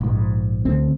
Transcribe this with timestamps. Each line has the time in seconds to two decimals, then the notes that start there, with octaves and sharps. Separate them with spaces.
0.01 A#1 G#2
0.65 D2 C4